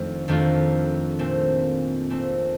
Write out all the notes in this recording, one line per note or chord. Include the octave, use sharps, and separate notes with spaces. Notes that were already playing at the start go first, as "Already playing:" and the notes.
Already playing: F2 D#3 A3 D4 F4
F2 D#3 A3 D4 F4
A#2 A3 C4
A#2 A3 C4